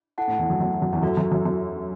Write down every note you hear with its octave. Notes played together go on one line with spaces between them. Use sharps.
E4 A4 F#5 A5
A2
E2
F#2
F#2
F#2
E2
F#2 F#4 A4 E5
F#2
F#2
F#2